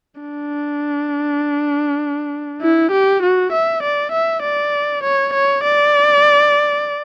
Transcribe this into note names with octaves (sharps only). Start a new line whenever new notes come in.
D4
E4
G4
F#4
E5
D5
E5
D5
C#5
C#5
D5